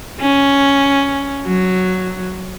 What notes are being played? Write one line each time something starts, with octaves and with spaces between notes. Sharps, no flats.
C#4
F#3